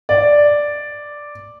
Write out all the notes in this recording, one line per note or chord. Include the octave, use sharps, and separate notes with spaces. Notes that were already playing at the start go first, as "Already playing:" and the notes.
D5